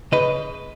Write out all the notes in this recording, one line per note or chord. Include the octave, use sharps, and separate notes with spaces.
C#3 B4 D#5